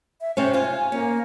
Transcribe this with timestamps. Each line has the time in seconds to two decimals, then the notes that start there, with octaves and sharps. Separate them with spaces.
0.21 E5
0.37 C3 C4 C#4 C5
0.54 F4 G#5
0.92 A#3 C#4